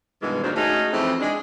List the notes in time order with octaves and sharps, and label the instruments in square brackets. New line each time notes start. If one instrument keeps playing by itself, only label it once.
[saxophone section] G2 B2 D#3 E3 G#3
D2 A#2 D#3 F#3 D4 C5
G#3 A3 C#4 D#4 F#4 G#4
F2 E3 A3 C4
G#3 D4